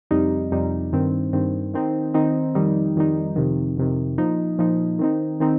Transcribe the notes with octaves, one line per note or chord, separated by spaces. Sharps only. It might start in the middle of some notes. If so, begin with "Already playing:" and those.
F2 C3 G3 D#4
F2 C3 G3 D#4
G2 D#3 C4
G2 D#3 C4
D#3 C4 D#4
D#3 C4 D#4
F2 D#3 G3 D#4
F2 D#3 G3 D#4
F2 C3 D#3
F2 C3 D#3
A#2 F3 D#4
A#2 F3 D#4
D#3 C4 D#4
D#3 C4 D#4